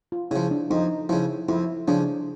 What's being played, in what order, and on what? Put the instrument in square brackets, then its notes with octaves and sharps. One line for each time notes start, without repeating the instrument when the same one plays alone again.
[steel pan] F4
[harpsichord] C#3 F3 [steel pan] E4
[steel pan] D4
[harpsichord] F2 [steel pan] D#4
[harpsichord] C#3 F3 [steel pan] E4
[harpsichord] F2 [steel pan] E4
[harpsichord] C#3 F3 [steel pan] D4